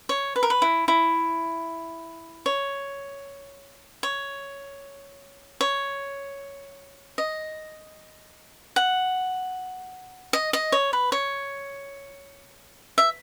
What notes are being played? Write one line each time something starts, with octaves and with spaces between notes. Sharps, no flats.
C#5
B4
A#4
B4
E4
E4
C#5
C#5
C#5
D#5
F#5
D#5
D#5
C#5
B4
C#5
E5